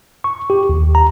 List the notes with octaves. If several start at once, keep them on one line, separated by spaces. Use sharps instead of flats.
C#6
G4
D#2
A#5